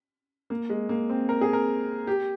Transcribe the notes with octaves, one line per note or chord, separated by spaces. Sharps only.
A#3
G#3
A#3
C4
A#4
G#4
A#4
G4